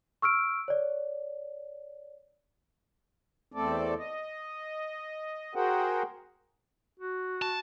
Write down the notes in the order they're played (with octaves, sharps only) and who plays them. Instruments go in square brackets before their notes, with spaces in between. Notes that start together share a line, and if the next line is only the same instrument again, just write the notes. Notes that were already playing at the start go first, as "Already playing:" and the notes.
[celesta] C#6 E6 F6 D7
C#5 D5
[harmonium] E2 A3 C4 A4 D5
D#5
F#4 G#4 A#4 C5 F#5 G5
[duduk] F#4
[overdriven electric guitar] A5